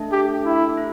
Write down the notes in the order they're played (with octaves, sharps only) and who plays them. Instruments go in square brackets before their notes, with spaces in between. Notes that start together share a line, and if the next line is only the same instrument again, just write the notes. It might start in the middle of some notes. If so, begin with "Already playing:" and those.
Already playing: [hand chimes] A3 D4 A4 E5 A5
[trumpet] G4
E4
[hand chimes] E4